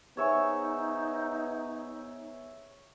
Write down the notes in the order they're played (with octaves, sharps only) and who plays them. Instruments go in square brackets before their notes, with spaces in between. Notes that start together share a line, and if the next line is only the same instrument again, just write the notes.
[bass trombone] B3 [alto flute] D#4 [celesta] G#4 C5 G#5 [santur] C#5 E5 C#6